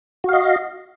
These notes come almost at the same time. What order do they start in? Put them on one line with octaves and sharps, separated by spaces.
F#4 F5 D#5